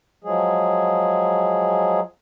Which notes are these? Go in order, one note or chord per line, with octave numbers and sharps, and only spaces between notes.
F3 F#3 G#3 G#4